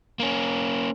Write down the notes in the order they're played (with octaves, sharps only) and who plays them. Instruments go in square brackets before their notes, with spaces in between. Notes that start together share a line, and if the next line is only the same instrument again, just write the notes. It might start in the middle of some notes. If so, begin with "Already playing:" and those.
[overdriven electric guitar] A#3 C#4